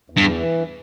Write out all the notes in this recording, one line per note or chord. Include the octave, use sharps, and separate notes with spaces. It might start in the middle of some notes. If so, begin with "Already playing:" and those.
E2
G2
E3